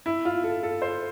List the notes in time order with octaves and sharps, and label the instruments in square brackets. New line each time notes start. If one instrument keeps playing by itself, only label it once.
[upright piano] E4
F4
A4
A4
C5